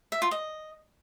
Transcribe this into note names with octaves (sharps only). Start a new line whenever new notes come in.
E5
F4
D#5